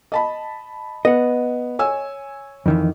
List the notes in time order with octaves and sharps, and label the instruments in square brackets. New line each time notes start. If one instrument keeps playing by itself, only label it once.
[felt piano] D#5 A5 B5
[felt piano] B3 [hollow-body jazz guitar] D#5 F#5
[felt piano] C#5 G#5 E6
[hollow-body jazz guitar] F2 D#3 E3